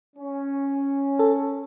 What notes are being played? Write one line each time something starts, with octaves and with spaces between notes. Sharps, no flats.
C#4
A4